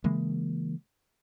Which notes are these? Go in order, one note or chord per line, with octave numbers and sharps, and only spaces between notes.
C#3 E3 G#3 A#3